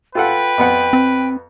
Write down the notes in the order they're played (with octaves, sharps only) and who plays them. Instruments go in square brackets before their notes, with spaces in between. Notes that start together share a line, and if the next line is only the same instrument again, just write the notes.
[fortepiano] F4 A4 F#5 [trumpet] B4 [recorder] G5
[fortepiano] F2 B3 F#5
[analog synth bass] C4